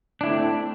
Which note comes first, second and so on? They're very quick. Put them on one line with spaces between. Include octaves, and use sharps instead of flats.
D4 E4 A3 F#3 C4